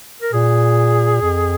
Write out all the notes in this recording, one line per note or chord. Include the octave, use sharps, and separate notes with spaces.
A#4
A#2 G#4
F2